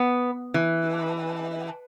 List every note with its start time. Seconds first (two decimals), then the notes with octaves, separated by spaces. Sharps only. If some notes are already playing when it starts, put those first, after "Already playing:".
Already playing: B3
0.54 E3